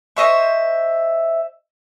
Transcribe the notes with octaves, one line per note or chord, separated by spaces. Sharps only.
C5 D#5 E5 C#6